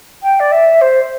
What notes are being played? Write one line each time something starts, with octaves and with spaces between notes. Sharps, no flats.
G5
D5
E5
C5